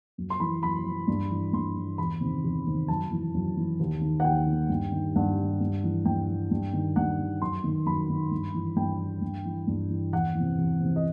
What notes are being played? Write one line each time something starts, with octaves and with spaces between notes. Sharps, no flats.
F#2
C6
E3 B5
F#2 B5
E3
G2
E3
G2 C6
E3
E2 B5
C3 D#3
E2
C3 D#3
F#2 A5
E3
F#2
E3
D#2
D#3
F#5
D#2 G5
D#3
G2
D#3
G2 F#5
D#3
G2
E3
G2 G5
E3
G2
D#3
G2 F#5
D#3
F#2 C6
D#3
F#2 B5
D#3
G2
E3
G2 G5
E3
G2
E3
G2
E3
E2 F#5
E3
C3
E2
C3 E3
D#5